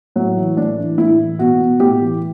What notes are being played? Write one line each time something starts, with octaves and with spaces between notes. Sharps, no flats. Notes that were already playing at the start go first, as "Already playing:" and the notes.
A2 F#3
E3
A2 D4
E3
A2 E4
E3
B2 F#4
B2
A2 G4
E3